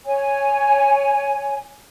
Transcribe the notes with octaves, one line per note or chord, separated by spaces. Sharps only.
C#5 G#5